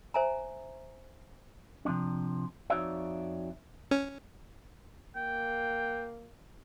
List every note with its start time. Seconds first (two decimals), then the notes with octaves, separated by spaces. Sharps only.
0.14 C5 E5 G#5 A#5
1.85 C3 F3 A#3 C#4 D4
2.70 F2 D#4 F#4 C#5 D5 E5
3.91 C#4
5.17 A#3 G5